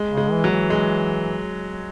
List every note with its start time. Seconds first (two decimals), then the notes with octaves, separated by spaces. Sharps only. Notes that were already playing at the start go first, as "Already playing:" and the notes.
Already playing: G#3
0.10 C#3
0.17 G#3
0.31 E3
0.44 F#3
0.50 E3
0.70 G#3